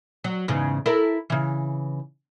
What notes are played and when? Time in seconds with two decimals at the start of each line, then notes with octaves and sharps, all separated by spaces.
0.24 F#3
0.48 E2 G#2 C#3
0.86 E4 A4 A#4
1.30 C#3 E3